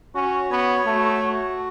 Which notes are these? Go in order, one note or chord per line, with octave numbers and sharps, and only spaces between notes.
C#4 F#4
B3 C#5
A3 F#4
F#4